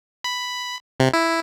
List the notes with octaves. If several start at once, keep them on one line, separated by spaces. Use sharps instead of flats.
B5
C3
E4